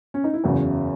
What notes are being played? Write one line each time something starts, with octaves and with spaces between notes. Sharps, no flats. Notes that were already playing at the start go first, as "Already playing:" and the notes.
C#4
D#4
E4
F#1 E2 C#3 F#4